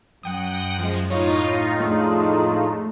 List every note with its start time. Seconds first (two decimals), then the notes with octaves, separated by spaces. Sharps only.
0.23 F#2 F#5 G5 D#6
0.79 F3 G#3
1.10 A2 D#4 F4 C#5
1.80 F2 G#3 A3 D4